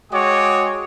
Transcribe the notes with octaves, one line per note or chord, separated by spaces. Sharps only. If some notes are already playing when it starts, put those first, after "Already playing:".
G#3 F#4 C#5 G5 D6 D#6